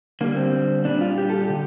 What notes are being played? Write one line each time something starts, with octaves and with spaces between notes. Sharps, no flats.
D3 G3 A#3
C4
A#2 G3 D4
F4
G4
A4
G4
D3